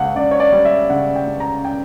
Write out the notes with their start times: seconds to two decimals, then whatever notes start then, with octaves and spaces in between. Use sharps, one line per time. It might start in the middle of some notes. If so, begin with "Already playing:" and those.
Already playing: C#2 C#3 F#5
0.16 C#2 D5
0.31 C#5
0.40 D5
0.52 G3
0.65 E5
0.90 C#3 F#5
1.16 G5
1.27 C#2
1.40 A#5
1.65 G5